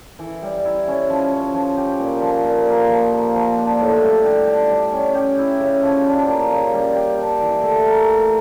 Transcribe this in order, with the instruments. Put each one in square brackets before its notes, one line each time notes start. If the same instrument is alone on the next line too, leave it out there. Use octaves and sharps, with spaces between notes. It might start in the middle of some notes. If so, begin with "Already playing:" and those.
[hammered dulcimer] E3
G3
E4
C#4
F3
C#4
F3
G4
A#2
F3
A#2
A#3
F3
A#3
F3
D4
A2
G3
G4
D4
G3
C#4
G4
E4
C#3
F3
D4
A#3
C#3
G3
G4
D4
E3
A3
A#4